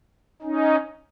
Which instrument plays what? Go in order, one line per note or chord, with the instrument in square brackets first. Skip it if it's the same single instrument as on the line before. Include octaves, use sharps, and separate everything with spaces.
[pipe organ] C#4 D#4